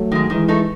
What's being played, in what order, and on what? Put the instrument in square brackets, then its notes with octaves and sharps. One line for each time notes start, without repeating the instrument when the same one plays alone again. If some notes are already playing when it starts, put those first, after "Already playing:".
Already playing: [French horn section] F#3 A3
[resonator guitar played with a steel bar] D#3 G#3
[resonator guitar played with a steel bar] D#3 [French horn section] E3 G#3
[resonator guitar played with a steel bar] A3 D#4 A4